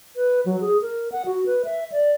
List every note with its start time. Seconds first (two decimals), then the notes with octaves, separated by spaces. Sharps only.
0.16 B4
0.46 F#3
0.61 G#4
0.82 A#4
1.12 F#5
1.26 F#4
1.46 B4
1.65 E5
1.92 D5